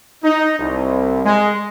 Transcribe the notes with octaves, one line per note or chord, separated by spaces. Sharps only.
D#4
C2
G#3